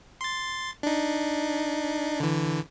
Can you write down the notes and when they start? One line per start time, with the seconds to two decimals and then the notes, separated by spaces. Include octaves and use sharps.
0.21 C6 A6
0.83 D4 D#4
2.20 D3 E3